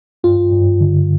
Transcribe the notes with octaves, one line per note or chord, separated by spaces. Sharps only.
G2 F4
G2
D3